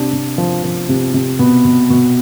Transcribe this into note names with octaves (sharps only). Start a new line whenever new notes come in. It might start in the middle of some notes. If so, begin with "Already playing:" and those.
Already playing: C3 D4
C3
F3
F3
C3
C3
B2 B3
B2
B2